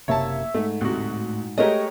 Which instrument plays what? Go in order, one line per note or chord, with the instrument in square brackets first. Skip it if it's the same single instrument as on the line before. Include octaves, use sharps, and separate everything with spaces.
[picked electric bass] F#1 C3 A#3 [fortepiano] C#5 A5 [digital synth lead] E5
[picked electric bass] G#2 [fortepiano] A3
[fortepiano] D2 C3 F#4 [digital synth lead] A2
[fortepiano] G#3 A3 A#4 [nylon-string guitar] G4 D#5 [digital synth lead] C#5